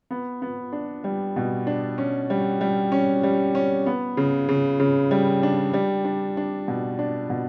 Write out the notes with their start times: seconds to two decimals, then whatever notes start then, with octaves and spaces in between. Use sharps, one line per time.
0.11 B3
0.42 B3
0.72 D4
1.04 G3
1.36 B2
1.67 D4
1.98 C#4
2.30 G3
2.61 G3
2.92 C#4
3.23 G3
3.55 C#4
3.86 B3
4.17 C#3
4.49 C#3
4.80 C#3
5.11 G3
5.43 D4
5.73 G3
6.05 D4
6.37 D4
6.68 B2
6.99 D4
7.30 B2